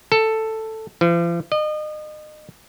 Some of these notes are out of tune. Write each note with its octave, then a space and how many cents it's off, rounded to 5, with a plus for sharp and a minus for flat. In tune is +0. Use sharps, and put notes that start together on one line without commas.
A4 +5
F3 -45
D#5 -35